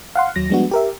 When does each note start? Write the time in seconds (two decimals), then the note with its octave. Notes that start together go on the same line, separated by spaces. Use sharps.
0.15 F5 F#5 C6
0.36 D#2 F#3 A#6
0.50 F3 G3 G#3 B3 D4 F#4
0.71 G4 A#4 E5